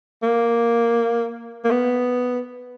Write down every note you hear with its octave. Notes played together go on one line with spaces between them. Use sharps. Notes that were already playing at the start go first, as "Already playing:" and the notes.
A#3
A#3
B3